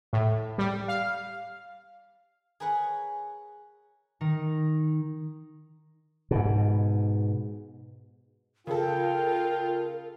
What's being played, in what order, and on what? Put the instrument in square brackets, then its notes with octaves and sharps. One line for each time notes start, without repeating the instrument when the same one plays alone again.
[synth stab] A2
G3
F5
[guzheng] G#4 A#4 B4 C#5 F#5
[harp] D#3 D#4
[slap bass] G#2 B2
[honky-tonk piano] C#3 A4 [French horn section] F4 [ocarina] A#4 [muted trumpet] G5